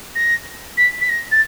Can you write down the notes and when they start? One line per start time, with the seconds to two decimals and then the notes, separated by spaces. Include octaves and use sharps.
0.15 A#6
0.77 B6
1.01 B6
1.09 A#6
1.31 A6